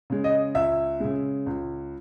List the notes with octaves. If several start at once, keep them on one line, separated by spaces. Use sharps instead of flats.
C#3 G#3
D#5
C#2 E5
C#3 G#3
C#2